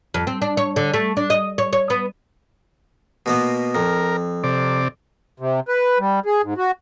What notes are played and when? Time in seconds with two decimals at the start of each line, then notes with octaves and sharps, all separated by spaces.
0.14 F2
0.27 C4
0.42 D4
0.57 C#5
0.76 D3
0.94 A3
1.17 D4
1.30 D#5
1.58 C#5
1.73 C#5
1.90 B3
3.26 B2 A#3 B3
3.75 F2 A#4
4.44 C3 D5
5.40 C3
5.68 B4
5.99 G3
6.26 G#4
6.44 G#2
6.58 F#4